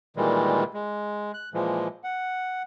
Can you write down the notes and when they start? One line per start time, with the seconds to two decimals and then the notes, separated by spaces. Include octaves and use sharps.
0.17 A#2 D#3 E3 G3 G#3
0.74 G#3
1.34 F#6
1.54 A#2 E3 F3 G#3
2.04 F#5